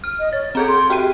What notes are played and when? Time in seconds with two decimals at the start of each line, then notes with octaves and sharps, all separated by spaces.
0.04 F6
0.20 D#5
0.33 C#5 A6
0.55 C4 G#4 A4 A#5
0.68 C6
0.90 F#4 G4 G5 D#7